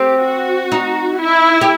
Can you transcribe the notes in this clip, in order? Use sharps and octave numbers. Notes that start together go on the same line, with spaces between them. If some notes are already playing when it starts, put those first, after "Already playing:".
Already playing: C4 G4
F#4
D#4
E4
G4